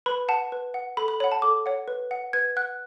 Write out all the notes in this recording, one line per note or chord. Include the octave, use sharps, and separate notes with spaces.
B4 B5
F#5 A5
B4
F#5
A4 B5
B5
C#5 F#5 B5
A5
A4 D6
C#5 F#5
B4
F#5
B4 G#6
F#5 F#6